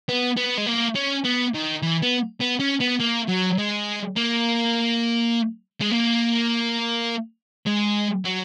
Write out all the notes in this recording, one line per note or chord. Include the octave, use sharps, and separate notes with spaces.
B3
B3
G#3
A#3
C#4
B3
D#3
E3
B3
B3
C#4
B3
A#3
F#3
G#3
A#3
G#3
A#3
G#3
F#3